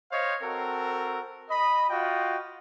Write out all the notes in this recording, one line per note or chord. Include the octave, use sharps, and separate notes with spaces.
C5 C#5 D#5 F5
C4 F#4 A4 A#4
D#5 B5
F4 F#4 D#5 G5